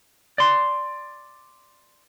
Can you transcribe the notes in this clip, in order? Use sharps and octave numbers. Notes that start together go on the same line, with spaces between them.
D5 C6